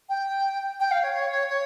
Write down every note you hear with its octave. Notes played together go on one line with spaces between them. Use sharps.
G5
G5
F5
C#5
C#5
C#5
C#5